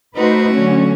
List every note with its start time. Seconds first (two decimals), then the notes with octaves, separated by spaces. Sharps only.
0.16 A3 D#4 F#4 B4 C5
0.53 D3 F#3 C#4